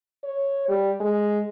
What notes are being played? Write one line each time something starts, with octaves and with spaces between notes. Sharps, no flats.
C#5
G3
G#3